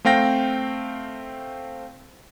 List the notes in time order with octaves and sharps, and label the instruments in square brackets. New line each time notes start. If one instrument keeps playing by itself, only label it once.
[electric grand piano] A3 C4 F5 G5 A#6